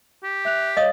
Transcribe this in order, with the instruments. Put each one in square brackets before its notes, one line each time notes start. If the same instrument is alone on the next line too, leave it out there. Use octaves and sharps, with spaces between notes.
[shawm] G4
[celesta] E5 F#6 F7
[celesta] C#5 F5 [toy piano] D#5 D#6